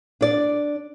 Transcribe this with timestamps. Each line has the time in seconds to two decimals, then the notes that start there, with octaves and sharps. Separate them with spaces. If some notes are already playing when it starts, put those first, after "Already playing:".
0.21 D4 D5